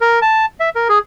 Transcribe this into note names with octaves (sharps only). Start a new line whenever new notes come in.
A#4
A5
E5
A#4
G#4